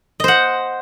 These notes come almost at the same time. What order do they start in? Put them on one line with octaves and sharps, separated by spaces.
D#5 C5 F#5